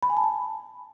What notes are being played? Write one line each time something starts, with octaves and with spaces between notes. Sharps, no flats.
B5
G#5
A5
B5